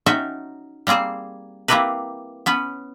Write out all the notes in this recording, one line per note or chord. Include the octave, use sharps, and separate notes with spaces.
C#4 D#4 F#4 E5 G5 A5
G3 A#3 C4 G#4 C5
A#3 C4 E4 G4 A#4 B4
B3 C#4 B4